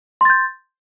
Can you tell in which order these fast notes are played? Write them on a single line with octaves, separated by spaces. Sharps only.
C6 A6 G6